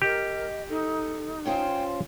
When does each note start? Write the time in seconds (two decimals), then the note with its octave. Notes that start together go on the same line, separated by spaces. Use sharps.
0.02 G4 A#4 D#5
0.69 D#4 A4
1.46 C#4 F4 C5 G5